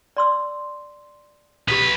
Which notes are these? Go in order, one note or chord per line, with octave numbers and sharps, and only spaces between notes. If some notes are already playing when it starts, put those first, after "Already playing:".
D5 C6 E6
B1 G4 B4 D#6